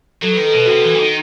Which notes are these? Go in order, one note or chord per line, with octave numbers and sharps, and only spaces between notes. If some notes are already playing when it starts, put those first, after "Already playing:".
F#3 A4
D#3 B4
A4
B2 B4
C3 F#4 A4
E3
E3
D#3